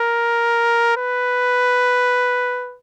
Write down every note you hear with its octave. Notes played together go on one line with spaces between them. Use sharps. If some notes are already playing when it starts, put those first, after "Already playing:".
Already playing: A#4
B4